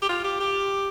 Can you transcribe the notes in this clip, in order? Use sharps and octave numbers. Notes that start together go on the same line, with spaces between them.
G4
F4
G4
G4